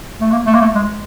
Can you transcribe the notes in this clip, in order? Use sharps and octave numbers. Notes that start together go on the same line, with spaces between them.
A3
A#3
A3
A#3
A3
G#3